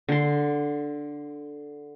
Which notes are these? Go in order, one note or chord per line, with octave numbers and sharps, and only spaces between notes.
D3 C6